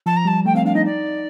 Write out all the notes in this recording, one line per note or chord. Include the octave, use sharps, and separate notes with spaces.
F3 A5
A#5
G3 A5
A3 G5
C4 F5
D4 F5
D#4 D#5
D5